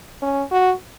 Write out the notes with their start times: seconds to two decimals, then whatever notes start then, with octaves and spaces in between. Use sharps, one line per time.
0.22 C#4
0.52 F#4